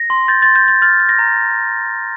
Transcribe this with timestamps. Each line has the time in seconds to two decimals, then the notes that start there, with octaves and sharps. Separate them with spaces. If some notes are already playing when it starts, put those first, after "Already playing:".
Already playing: A#6
0.10 C6
0.28 G6 A6
0.42 C6 A6
0.56 G6
0.64 C6 A6
0.82 F6 A6
1.00 F6
1.09 A#6
1.19 A#5